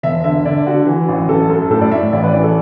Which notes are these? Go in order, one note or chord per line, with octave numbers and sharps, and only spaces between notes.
E1 E5
D3 E5
D3 D5
D3 F#4
E3
A1
F#2 A4
F#2 A4
A2 A4
D5
A2 E5
A1 D5
B4
E3 D5
A4